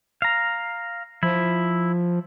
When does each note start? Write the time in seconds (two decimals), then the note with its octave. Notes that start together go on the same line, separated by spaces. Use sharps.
0.22 F5 A#5
1.23 F3 E4